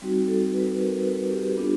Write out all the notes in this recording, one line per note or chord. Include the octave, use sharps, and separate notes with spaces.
G3 C4 D#4 F#4
A4
B4
B4
A#4
B4
G4
G3 B3 D4 F4